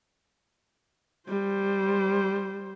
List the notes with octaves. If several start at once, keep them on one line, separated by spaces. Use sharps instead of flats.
G3 C5